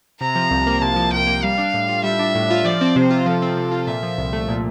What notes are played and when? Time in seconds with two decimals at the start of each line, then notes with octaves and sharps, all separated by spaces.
0.20 C3 A#5
0.36 F3
0.51 C2
0.67 A#3
0.81 C3 A5
0.96 F3
1.12 C2 G5
1.27 A#3
1.43 G3 F5
1.58 D4
1.74 A2
1.88 F4
2.04 G3 E5
2.19 D4
2.35 A2
2.50 F4
2.65 F3 D5
2.81 C4
2.96 C3 C5
3.10 F4
3.26 F3 A4
3.42 C4
3.57 C3
3.72 F4
3.87 A#2 E5
4.03 F3
4.18 C2
4.33 A3
4.48 A#2